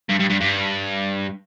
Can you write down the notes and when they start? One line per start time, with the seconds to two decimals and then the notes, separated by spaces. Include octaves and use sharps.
0.09 G2
0.20 G2
0.30 G2
0.41 G2